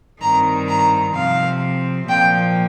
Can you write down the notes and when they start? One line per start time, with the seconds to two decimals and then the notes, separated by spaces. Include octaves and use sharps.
0.21 G2 D#3 C4 A#5
0.68 A#5
1.14 C3 F3 C4 F5
2.08 A#2 F3 A#3 G5